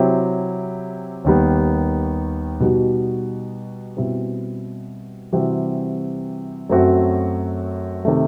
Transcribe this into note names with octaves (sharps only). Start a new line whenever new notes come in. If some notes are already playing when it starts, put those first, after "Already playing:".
Already playing: C3 F#3 C4 E4 G4
D#2 D#3 G3 B3
B2 G3 D#4 F#4
B2 G3 C4 E4
C3 E3 G3 C4 F#4
F#2 F#3 A3 C4 F#4
C3 D#3 A3